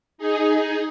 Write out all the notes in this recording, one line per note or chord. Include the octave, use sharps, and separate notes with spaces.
D#4 G#4